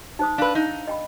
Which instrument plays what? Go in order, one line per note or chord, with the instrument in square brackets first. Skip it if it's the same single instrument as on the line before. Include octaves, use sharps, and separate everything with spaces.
[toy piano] D#4 C5 D#6
[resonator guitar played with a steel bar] D4 B4 [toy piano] F5 E6
[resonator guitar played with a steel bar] D#4
[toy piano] D#5 G5 B5